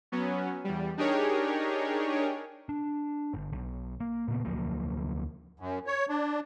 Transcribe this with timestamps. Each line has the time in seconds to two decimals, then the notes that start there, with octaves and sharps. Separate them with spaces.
0.12 F#3 B3 C#4
0.64 E2 G3
0.97 D4 D#4 G4 G#4 A#4 C#5
2.69 D4
3.34 G1
3.53 B1
4.00 A#3
4.28 A#2 C#3 B3
4.45 D2 F3 F#3 A#3
5.60 F#2
5.87 C#5
6.09 D4